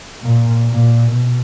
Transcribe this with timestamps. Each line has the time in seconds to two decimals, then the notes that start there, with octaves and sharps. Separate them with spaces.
0.21 A#2
0.68 A#2
1.10 B2